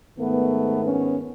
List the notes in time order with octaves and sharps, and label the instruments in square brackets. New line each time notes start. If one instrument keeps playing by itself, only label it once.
[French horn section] G#2 D#3 A3 B3
B3 C#4